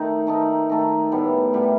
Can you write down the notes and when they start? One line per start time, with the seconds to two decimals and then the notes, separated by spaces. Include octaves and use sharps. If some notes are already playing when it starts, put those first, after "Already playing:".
Already playing: D#3 A3 D#4
0.27 D#3 A3 D#4
0.70 D#3 A3 D#4
1.12 A2 G3 B3
1.54 A2 G3 B3